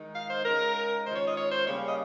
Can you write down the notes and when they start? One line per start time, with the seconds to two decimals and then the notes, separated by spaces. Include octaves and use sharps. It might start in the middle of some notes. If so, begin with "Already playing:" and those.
Already playing: D#3 G#3 D#4
0.14 F5
0.30 C5
0.45 C#3 G#3 D#4 A#4
1.06 D#3 G#3 C#4 F4 C5
1.16 C#5
1.27 D#5
1.37 C#5
1.52 C5
1.67 C#3 G3 A#3 C#4 C#5
1.87 D#5